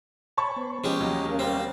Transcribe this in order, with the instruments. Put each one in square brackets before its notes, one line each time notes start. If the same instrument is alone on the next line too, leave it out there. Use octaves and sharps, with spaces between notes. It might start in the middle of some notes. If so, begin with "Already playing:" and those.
[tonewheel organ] C#5 G#5 [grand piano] A5 B5 C#6
[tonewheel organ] B3 C5
[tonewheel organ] F3 [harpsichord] G#3 C#4 G4
[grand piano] D#2 F#3
[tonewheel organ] C#4 A#4 F5
[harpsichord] G3 C4